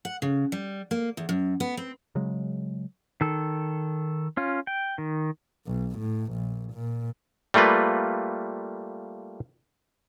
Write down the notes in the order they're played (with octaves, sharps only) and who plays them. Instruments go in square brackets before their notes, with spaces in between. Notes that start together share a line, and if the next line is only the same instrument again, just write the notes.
[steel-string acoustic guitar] F#5
C#3
G3
A#3
E2
F#2
B3
C4
[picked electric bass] C#3 F#3 G#3
[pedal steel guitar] D#3 A4
C#4 F4
G5
D#3
[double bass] B1
A2
A#1
A#2
[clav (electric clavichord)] G3 A3 A#3 F4 B4